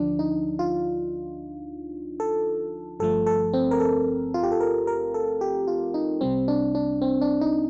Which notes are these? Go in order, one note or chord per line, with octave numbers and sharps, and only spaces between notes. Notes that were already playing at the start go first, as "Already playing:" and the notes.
Already playing: D2 D3 F3 D4
D#4
F4
A4
G1 G2 F3 A3 A4
A4
C4
A#4
A4
F4
G4
A4
A#4
A#4
A4
G4
F4
D#4
C2 C3 G3 C4
D4
D4
C4
D4
D#4